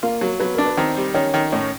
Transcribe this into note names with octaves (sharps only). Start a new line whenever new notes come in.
A#3 F4 A#4
F#3
F#3 B3 B4
D4 A#4
B4
D#3 C4 C5
G3
D#3 C#4 C#5
D#3
A2 C#4 C#5